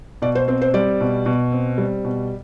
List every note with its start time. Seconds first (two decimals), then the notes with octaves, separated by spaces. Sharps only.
0.22 B2 D5
0.35 C5
0.48 C4 C5
0.62 C5
0.74 G3 D5
1.01 B2
1.26 B2
1.52 C4
1.78 G3
2.04 B2